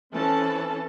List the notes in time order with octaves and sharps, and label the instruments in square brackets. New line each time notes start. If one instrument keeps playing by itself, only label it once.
[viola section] E3 C4 C#4 A4 A5